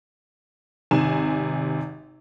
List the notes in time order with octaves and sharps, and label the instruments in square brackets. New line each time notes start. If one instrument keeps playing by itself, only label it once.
[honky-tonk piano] G#1 C3 G#5 E7